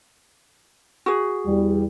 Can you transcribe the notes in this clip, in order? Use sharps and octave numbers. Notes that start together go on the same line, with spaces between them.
F#4 G#4
E2 G3